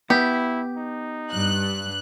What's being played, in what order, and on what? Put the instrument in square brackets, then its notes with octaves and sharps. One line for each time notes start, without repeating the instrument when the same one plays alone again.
[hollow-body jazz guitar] B3 [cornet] E4 [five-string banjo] G4
[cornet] D#4
[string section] G2 F#6